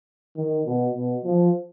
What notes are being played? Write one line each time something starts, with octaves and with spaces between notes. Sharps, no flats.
D#3
B2
B2
F3